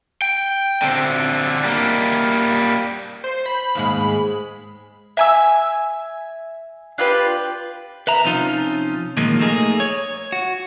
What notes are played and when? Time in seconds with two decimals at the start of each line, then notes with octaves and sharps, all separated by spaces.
0.22 G5
0.82 D3 C4
1.64 G3 A#3
3.24 C5
3.46 B5
3.75 D#2 G#2 G#3
5.17 E5 G#5 E6
6.98 D4 F4 G4 B4
8.07 B4 E5 A#5
8.25 C3 F3 C#4 D#4 F4
9.17 A#2 D#3 F3 F#3 G#3 A#3
9.40 A3 A#3 D#4 E4 G#4
9.80 C#5
10.32 F#4